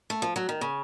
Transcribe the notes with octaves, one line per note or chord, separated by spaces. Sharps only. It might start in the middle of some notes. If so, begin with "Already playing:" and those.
A3
F3
F#3
D#3
C#3